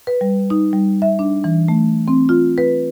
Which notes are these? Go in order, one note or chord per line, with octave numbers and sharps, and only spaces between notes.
B4
G3
D#4
G3
E5
D4
E3
A3
C4
F4
B4